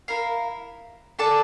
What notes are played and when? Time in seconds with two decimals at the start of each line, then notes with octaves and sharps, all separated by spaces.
0.08 E4 A#4 F5
1.19 D4 A4 D5 A5